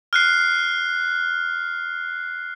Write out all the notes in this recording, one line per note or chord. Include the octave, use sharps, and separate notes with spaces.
F6 F#6 C7